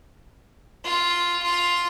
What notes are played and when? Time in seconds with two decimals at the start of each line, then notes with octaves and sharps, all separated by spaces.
0.84 F4
1.43 F4